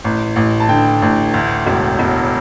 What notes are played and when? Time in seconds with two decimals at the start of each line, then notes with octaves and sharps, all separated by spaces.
0.04 A1
0.36 A1
0.60 A5
0.69 D3 G5
1.02 A1
1.34 D2
1.67 E1
1.99 E1